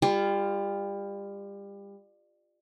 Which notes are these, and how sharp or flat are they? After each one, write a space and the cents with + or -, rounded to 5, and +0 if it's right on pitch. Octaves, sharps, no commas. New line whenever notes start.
G3 +30 F4 -5